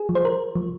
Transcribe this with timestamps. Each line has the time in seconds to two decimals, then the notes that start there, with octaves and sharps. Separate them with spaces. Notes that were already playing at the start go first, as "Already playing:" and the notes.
Already playing: G#4
0.09 F3
0.15 C5
0.25 A#4
0.55 F3